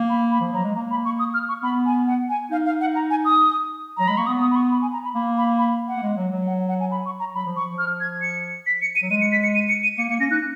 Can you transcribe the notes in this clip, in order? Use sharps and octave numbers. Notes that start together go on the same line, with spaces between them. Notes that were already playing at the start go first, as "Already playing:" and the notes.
Already playing: A#3
B5
B5
F3
F#3 A#5
G#3
A#3 A#5
B5
C#6
D#6
F6
C#6
B3 B5
G#5
F#5
G#5
D#4 F5
F5
F#5
A#5
G#5
D#6
F#3 A#5
G#3 B5
A#3 C#6
B3 D#6
D#6
B5
C#6
B5
G#5
A#5
B5
A#3 B5
B5
B5
F#5
A#3
G#3
F#3
F#3
F#5
F#5
G#5
B5
C#6
A#5
F#3 B5
F3
C#6
F3
F6
G#6
C#7
B6
C#7
D#7
F#3
G#3 D#7
C#7
B6
C#7
D#7
C#7
D#7
A#3 C#7
A#3 C#7
C#4 A#6
D#4 F#6